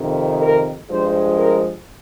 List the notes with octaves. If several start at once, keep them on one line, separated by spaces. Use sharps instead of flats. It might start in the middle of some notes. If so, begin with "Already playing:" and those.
Already playing: F2 C3 D#3
A#4
G2 F3 G#3 C5
A#4